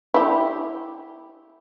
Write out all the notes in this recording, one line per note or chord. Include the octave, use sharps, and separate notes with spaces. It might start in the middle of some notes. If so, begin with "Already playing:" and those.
E4 G4